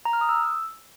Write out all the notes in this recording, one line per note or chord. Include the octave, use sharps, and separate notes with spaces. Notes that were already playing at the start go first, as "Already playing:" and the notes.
A#5
F6
D#6
E6